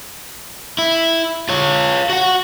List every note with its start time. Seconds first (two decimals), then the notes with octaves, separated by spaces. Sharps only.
0.78 E4
1.49 F4 C#5
2.10 F#4 F#5